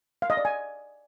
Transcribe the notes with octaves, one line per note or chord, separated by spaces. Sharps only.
F5
D#5
D5
G#5